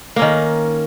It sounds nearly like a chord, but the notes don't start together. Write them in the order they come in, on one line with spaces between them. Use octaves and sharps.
A#3 C#4 D#3